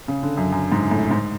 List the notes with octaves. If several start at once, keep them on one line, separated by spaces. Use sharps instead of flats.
C#3
D3
F#2
F#2
G#2
A2
G#2